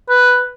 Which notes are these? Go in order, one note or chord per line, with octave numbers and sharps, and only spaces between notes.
B4